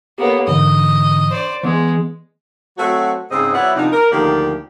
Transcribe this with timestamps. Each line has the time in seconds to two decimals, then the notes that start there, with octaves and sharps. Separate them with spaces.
0.18 A#3 B3 G4 A4 C#5
0.48 G#2 D3 E3 D#5
1.30 C5 D5
1.63 E3 G#3 B3
2.78 F#3 A3 C4 F#4
3.31 G#2 C#3 C4 D#5
3.54 F#3 B3 E4 D5 E5 F#5
3.75 C3 F3 D4 D#4
3.92 A#4
4.11 D2 D#3 F3 A#3 G4 D5